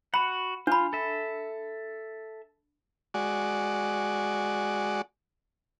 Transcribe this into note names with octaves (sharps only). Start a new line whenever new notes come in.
F#4 F#5 B5
D4 F4 B5
A4 E5
G#3 F#4 D5